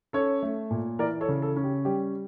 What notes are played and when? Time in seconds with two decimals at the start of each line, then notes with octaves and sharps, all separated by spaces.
0.13 C#4 A4 C#5
0.43 A3
0.71 A#2
0.99 E3 A#4 D5
1.21 A4 C#5
1.29 C#3
1.42 A4
1.56 C#4
1.64 G4
1.85 G3 G4